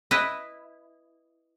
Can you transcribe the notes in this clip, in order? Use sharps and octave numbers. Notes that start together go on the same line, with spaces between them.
E4 B4 D#5